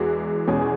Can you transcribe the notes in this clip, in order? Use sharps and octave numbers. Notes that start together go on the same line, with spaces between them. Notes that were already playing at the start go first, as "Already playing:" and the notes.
Already playing: E2 E3 G#3 F#4
E2 B2 G#3 C#4 G#4